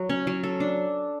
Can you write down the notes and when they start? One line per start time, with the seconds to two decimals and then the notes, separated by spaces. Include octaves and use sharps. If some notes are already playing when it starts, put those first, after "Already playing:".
Already playing: F#3
0.10 C#4
0.27 F#3
0.43 A4
0.60 D4